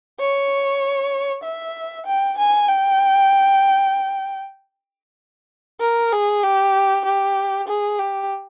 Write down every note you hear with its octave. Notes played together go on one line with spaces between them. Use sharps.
C#5
E5
G5
G#5
G5
A#4
G#4
G4
G4
G#4
G4